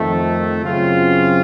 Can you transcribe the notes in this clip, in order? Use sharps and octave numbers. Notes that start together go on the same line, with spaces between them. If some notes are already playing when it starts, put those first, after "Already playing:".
Already playing: F2 D#3 A3
F#2 C#3 F#3 C4 F4